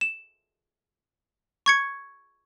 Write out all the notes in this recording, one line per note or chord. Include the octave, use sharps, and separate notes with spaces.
E7
C#6 G#6 C#7